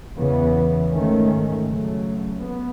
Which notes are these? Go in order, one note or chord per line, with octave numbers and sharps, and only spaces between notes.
E2 C#3 E3 B3
G#2 D#3 A3 C#4
C#3 F#3 A3
B3